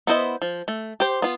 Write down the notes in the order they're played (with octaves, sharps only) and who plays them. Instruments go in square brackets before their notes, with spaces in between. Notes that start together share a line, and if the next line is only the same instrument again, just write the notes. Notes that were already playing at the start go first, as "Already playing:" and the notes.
[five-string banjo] B3 E4 C5 D#5
F3
A3
G4 C5
B3 F4